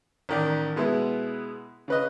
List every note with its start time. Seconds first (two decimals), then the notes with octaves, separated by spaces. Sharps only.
0.29 A1 D#3 D5
0.76 B2 G#3 B3 E4
1.88 C#3 B4 D#5